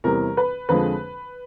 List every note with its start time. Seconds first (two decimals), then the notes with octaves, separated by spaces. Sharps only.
0.04 E2 C3 E3 G3 A#4
0.37 B4
0.69 F2 D3 F3 G#3 B4